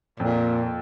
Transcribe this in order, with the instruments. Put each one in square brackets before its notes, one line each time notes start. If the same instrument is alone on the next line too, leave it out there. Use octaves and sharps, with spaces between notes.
[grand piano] F2 [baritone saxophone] A#2